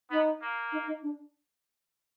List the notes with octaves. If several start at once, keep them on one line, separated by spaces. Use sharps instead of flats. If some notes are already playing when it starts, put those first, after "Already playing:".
B3 D#4
A#3
D#4
D#4
D4